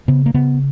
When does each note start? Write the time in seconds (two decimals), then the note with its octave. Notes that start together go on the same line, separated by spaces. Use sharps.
0.08 C#3 B3
0.26 A#3
0.34 C#3 B3